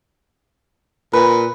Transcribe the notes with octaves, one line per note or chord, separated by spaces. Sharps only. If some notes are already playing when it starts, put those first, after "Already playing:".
A#2 B4